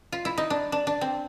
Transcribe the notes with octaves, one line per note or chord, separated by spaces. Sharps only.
F4
E4
D#4
D4
D4
D4
C4